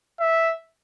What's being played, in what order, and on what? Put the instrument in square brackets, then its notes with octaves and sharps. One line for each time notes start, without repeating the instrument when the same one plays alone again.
[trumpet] E5